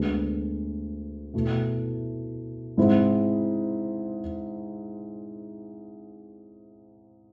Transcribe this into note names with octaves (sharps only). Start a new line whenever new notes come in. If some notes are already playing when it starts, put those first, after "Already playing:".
Already playing: D2 D3 G#3 B3 D4
B2 A3 E4
G#2 G#3 C4 E4